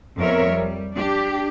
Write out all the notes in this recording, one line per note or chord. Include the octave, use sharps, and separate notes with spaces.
F2 B3 A#4 C#5 E5
G3
D4 G4